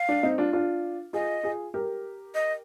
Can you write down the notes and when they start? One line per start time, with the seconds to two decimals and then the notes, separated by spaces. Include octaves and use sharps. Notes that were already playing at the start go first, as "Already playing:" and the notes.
Already playing: F5
0.09 D4
0.23 C4 D#4
0.38 D4 F4
0.53 D4 F4
1.13 F4 G#4 D#5
1.43 F4 G#4
1.74 G4 A#4
2.35 D#5